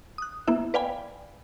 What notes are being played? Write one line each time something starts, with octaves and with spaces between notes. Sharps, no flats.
D#6 F#6
A#3 B3 E4 E5
B4 D5 F5 G5 G#5 B5